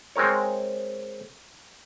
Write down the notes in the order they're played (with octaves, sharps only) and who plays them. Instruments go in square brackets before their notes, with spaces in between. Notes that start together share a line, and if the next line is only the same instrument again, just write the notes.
[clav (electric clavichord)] G#3 C4 A#4 C#5